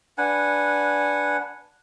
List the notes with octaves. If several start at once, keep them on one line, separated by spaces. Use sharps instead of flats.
D4 B4 F#5 G#5